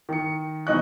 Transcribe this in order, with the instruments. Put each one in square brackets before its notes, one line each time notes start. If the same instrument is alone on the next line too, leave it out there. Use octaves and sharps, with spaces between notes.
[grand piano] D#3 C#7
A#1 B2 E3 D#4 C#6 F#6